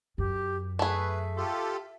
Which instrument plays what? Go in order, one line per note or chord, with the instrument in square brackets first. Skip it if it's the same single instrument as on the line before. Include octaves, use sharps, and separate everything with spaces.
[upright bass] F#2 [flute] G4
[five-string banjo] A3 G#4 [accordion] B4 [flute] E5
[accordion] F4 G4 A4